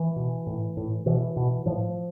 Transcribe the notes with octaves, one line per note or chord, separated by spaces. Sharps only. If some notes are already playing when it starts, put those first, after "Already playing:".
Already playing: E3
B2
A2
A2
B2 E3
B2
A2 F3